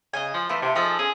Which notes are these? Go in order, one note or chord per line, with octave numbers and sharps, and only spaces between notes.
C#3 D#5 G#5
F3
E3 A3 F4
C3
F3 D#4 G#4 A4
C#4 G#4